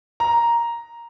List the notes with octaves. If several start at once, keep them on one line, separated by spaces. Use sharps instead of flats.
A#5